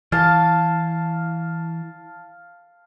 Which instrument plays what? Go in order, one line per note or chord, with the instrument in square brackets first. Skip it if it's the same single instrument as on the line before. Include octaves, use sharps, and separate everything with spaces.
[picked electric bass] E3 [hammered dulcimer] F5 A5